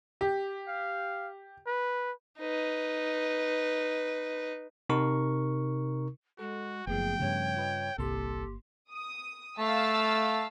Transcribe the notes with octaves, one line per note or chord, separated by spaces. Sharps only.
G4
F5
B4
D#4 B4
C3 D#4 A#4 C#6
G#3 F#4 A4
F#1 F3 A3 B3 G#4 G5
G2 C#3 C#5
F4 B4 D#5
G1 C2 A#3 G4 A4 C6
D#6
A3 F5 A5 E6